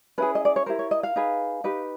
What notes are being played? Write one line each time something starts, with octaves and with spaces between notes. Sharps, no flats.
C#4 E4 G#4 B4
D#5
D5
C#5
E4 G4 A#4 C5
C#5
D#5
F5
D#4 G#4 B4
D#4 G4 B4